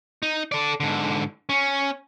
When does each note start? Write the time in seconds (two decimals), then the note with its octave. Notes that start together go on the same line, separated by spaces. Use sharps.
0.23 D#4
0.52 A4 D5
0.80 G#2 D3
1.49 C#4